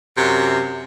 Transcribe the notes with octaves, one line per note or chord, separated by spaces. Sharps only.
F#2 C3